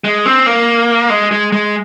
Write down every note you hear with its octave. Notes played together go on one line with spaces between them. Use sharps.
G#3
C4
A#3
G#3
G#3
G#3